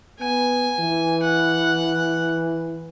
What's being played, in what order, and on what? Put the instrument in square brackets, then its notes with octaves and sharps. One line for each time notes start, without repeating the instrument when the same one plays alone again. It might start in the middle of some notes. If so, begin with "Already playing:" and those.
[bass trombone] B3 [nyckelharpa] G#5
[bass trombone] E3
[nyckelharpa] F#5